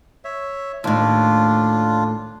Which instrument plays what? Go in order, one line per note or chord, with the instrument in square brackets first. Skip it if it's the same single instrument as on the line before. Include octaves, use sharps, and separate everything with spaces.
[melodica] C#5 E5
[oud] D#2 A2 [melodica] D4 F4